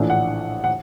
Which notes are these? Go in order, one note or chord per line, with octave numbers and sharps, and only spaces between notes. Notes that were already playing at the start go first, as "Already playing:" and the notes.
Already playing: A#1 A2 E3 A3 D4
F#5
F#5